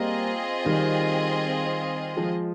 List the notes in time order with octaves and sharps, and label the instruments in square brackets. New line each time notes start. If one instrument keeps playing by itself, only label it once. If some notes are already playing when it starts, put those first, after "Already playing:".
Already playing: [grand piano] G3 A#3 [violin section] C4 F4 G#4 D#5
[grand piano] D#3 G3
F3 G#3